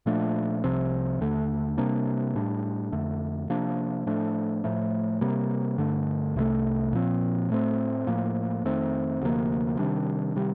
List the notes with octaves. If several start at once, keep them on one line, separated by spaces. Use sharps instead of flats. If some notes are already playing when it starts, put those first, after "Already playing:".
A#2 F3 A3 D4
C2 C3 F3 C4
D#2 D3 A3
C3 G3 A#3 D4
A2 G3 D4
F2 D3 A3
C3 F3 A#3 D4
A2 F3 A3 D4
A2 F3 A3
C3 G3 A#3
G2 D3 A3
C2 C3 D#3 A3
A#2 F3 C4
A2 A3 C4
A2 F3 A#3
F2 D#3 A3 C4
D2 C3 F3 A#3
C3 D#3 G3 D4
C3 D#3 G3